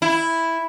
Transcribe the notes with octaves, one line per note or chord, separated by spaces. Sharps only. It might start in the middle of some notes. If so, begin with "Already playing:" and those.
E4